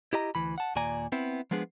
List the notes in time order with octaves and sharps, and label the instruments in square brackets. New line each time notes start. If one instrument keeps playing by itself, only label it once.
[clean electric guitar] E4 G4 D#5 A#5
D2 E3 B5
F#5 A5
D#2 A#2 A#3 D5 G#5 A#5
B3 C4 E4
F3 G#3 B3 D4 G#4